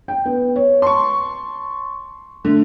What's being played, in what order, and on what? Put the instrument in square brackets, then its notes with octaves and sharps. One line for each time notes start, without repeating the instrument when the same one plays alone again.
[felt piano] G5
B3
C#5
[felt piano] A5 [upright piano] C6 C#6
[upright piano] D3 [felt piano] A3